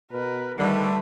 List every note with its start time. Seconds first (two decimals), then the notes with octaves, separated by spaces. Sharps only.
0.12 B2 A#4 B4
0.58 D3 D#3 G3 A3 B4